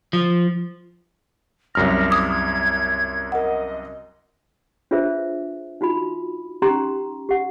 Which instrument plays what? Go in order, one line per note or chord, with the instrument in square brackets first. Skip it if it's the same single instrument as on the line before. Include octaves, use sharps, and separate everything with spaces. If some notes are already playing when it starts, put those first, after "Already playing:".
[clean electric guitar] F3
[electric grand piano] C2 F#2 F6 [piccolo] A#6
[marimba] D6 D#6 [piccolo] G#6
[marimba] A#4 F#5 [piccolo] D#5
[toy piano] D4 F4 G#4 B4 C5 E5
D#4 F4 F#4 B5
C#4 D#4 G4 A#5 C6
G4 F#5